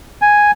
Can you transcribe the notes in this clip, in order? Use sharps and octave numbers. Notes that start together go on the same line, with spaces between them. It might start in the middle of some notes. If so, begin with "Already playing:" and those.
G#5